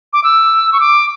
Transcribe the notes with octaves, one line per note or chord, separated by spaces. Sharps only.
D6
E6
C#6
D6